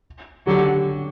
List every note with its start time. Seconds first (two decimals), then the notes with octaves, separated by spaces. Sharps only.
0.47 D3 F#3 G4